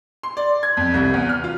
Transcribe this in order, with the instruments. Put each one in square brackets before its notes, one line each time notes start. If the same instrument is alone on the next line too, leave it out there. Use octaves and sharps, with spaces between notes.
[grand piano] C6
D5
G#6
F2
C2
E2
F6
F4